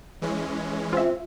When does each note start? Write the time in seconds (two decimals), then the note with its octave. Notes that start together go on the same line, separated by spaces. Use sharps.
0.22 E3 G#3 C#4
0.93 C4 F4 E5